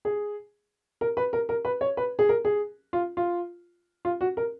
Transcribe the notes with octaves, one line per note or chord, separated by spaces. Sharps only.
G#4
A#4
B4
A#4
A#4
B4
C#5
B4
G#4
A#4
G#4
F4
F4
F4
F#4
A#4